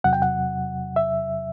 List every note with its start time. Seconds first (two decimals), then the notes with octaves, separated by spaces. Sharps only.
0.04 E2 C3 F#3 F#5
0.13 G5
0.22 F#5
0.96 E5